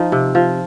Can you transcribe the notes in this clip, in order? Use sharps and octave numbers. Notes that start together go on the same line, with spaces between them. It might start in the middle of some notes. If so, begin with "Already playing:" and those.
Already playing: F3 D#4
C3
F3